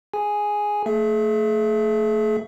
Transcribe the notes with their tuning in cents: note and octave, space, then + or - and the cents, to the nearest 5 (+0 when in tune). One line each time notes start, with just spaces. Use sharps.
G#4 +0 G#5 +0
A3 +25 G#4 +40 E5 +25